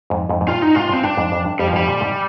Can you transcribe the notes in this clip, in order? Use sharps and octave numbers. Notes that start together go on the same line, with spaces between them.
F2 G#2
F2 G#2
G#2
G2 A#2 F4
D#4
G#2 C3 F4
G2 C4
G2 D4
F2 G#2
F2
G2
F2 G3
F3
F2 G#2 G3
A#2 D3
G#2 C3